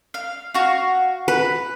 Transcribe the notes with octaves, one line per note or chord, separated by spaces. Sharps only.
F5
F#4 F5
B4